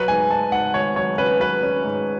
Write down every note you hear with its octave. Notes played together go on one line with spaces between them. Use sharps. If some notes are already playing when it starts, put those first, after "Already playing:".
Already playing: F#3 B4
G#2 G#5
G#2 A5
G#2 F#5
G#1 C#5
F#3 C#5
C#4 B4
F#3 B4
C#4
G#2